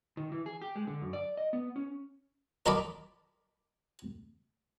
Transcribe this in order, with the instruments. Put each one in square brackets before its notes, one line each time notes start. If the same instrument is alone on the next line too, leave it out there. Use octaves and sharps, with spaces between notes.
[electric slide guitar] D#3
E3
G#4
G4
G#3
D3
F#2
D5
D#5
B3
C#4
[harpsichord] A#4 D#5 A5 B5 D6